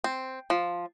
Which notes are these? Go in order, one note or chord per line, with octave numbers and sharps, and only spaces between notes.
C4
F3